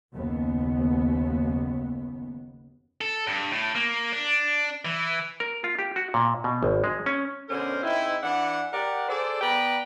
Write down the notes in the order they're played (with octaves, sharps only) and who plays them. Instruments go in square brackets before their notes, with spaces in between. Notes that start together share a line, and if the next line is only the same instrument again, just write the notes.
[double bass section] F#1 D#2 B3
[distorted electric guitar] A4
G2
A2
A#3
D4
E3
[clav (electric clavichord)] A#4
F4
G4
F#4
A#2
B2
G#1
G#3
C#4
[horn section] B2 D3 C#4 A#4 C5
G#2 C4 D#4 E4
E3 D4 F#5
G4 A#4 D5 F#5
G#4 A4 C5 D5
B3 B4 D5 G5 A#5